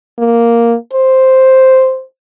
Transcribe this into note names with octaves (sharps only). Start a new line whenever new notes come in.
A#3
C5